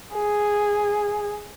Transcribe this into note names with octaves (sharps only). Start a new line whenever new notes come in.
G#4